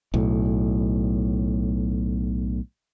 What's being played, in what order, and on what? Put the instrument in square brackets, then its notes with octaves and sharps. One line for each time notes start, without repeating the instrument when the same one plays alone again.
[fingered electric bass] B1 A2